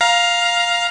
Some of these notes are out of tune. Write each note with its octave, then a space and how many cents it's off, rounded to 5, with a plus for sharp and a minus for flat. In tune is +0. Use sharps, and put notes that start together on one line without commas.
F5 +5 A#5 +20